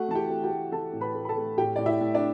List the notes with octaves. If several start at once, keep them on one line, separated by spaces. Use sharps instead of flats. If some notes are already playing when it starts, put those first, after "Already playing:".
Already playing: A3 F#4 F#5
E3 A5
G4 G5
A3
G4 G5
A3
E3 A4 A5
A2
B4 B5
A3
B5
A4 A5
A3
A2 G4 G5
A2 D5
E4 E5
A2
D4 D5